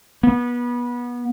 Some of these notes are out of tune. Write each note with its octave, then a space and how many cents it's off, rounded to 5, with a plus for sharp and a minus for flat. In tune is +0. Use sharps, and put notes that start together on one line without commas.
B3 -25